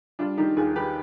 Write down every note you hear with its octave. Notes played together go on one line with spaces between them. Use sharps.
G3 D4 F4
D#3 D#4 G4
D#2 F4 G#4
D#3 G4 B4